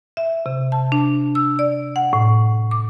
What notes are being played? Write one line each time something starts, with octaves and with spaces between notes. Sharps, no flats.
E5
C3
A5
D4
E6
D5
F#5
A2
D6